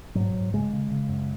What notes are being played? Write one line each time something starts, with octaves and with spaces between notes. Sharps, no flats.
G#2 F#3
G#2
C#3 G#3
C#3
C#3
F#2